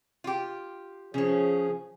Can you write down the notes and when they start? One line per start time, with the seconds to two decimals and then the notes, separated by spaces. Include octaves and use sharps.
0.24 F4 G4
1.14 C#3 F3 C#4 G#4